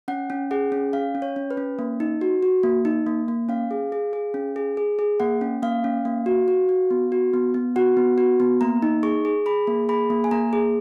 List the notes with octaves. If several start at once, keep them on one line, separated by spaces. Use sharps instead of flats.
C#4 F#5
C#4
G#4 F#5
C#4
C#4 F5
C#4
C#5
C#4
B4
C#4
A#3
D#4
F#4
F#4
A#3
D#4
A#3
A#3
C#4 F5
G#4
G#4
G#4
C#4
G#4
G#4
G#4
A#3 F#5
C#4
A#3 F5
C#4
A#3
F#4
F#4
F#4
B3
F#4
B3
B3
F#4 F#5
B3
F#4
B3
A#3 A#5
D#4
G#4 C#6
G#4
G#4 B5
A#3
G#4 B5
A#3
G#5
A#3 A#5
G#4